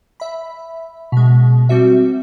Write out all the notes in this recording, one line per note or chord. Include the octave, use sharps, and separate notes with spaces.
E5 B5
B2 G#3
G3 C4 F#4 E5